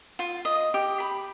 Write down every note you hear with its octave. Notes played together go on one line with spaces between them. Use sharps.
F4
D#5
G4
B5